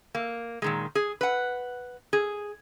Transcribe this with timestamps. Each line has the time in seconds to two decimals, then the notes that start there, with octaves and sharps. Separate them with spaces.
0.15 A#3
0.62 A#2 D#3 G#3
0.95 G#4
1.21 B4 F#5
2.13 G#4